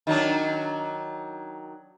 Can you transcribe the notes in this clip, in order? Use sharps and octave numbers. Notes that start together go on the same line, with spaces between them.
D#3 F#3 D4